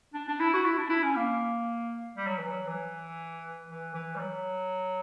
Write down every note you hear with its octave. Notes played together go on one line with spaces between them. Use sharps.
D4
D4
E4
F#4
E4
D4
E4
C#4
A#3
G3
F#3
E3
F#3
E3
E3
E3
G3
F#3